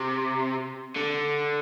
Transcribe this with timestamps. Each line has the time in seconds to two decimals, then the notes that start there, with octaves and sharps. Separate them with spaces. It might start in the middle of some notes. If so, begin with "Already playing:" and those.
Already playing: C3
0.96 D3